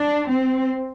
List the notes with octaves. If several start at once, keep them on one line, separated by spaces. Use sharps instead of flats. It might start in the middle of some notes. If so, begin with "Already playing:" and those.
Already playing: D4
C4